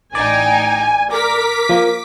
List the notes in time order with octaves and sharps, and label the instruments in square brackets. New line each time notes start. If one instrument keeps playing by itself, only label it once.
[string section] A1 D#4 G5 [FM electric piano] D5 [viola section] G#5
[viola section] A#4 [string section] D6 B6
[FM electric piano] F3 A#3